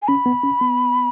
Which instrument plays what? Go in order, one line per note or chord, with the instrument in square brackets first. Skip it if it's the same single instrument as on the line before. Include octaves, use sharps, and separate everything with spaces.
[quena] G#5
[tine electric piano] C#4 [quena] B5
[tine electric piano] B3
C#4
B3